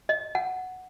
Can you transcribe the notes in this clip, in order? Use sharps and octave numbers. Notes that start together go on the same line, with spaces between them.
D#5
F#5